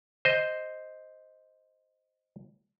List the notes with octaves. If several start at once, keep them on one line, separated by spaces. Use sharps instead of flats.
C5 D#5